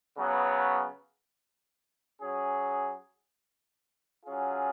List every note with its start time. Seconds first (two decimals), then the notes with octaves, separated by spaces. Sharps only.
0.16 C#3 F#3 B3
2.21 F#3 C#4 G#4
4.26 F#3 C#4 F4 G#4